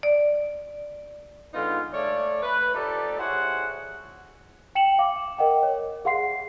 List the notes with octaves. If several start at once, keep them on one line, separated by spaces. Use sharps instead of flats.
D5
D3 G#3 B3 D#4 F4
A3 C#5 D5
B4
F3 A3 D#4 G4 A4 D5
E4 F#4 G#4 C5 C#5 F#5
G5 C#7 E7 F#7
F5 D6
A#4 D#5 F#5 G5
C#5
G#4 F5 F#5 C6 C7